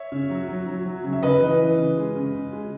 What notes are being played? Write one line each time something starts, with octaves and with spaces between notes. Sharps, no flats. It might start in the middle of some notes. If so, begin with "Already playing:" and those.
Already playing: C#5 E5
C#3
F#3
F#3
F#3
F#3
C#3
E5
C#3 B4 D#5
E3
E3
C#3
G#3
C#3
C#3
G#3